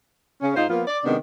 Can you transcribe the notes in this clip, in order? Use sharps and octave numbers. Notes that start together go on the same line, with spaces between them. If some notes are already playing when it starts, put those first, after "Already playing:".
C#3 C#4
G#2 D#4 F4 C5
F3 A#3 B3 F4
D5
C3 D#3 G#3 B3 D4